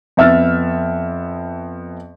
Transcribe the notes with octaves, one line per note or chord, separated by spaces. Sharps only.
F2 B3 E5 E6 F6 A6